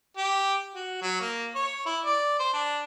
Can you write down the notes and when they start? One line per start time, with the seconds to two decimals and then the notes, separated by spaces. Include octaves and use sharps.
0.17 G4
0.76 F#4
1.02 F#3
1.21 A#3
1.55 C#5
1.86 E4
2.05 D5
2.39 C5
2.54 D4